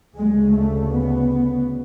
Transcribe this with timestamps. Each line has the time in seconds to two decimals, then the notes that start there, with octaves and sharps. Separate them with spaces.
0.17 D2 C#3 G#3
0.55 A3
0.93 B3